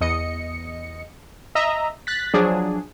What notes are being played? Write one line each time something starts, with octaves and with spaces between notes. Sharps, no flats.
E2 D#5 C#7
D#5 E5 A#5
F#6 A6 B6
F3 F#3 D4 G#4